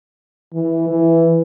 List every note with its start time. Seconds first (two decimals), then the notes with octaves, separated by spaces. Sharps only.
0.54 E3
0.89 E3